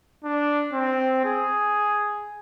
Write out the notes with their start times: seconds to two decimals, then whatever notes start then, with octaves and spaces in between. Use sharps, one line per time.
0.24 D4
0.73 C4
1.25 G#4